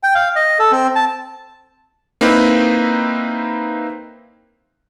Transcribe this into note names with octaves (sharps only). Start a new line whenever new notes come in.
G5
F5
D#5
A4
C4
A5
A#3 C4 D#4 E4 B4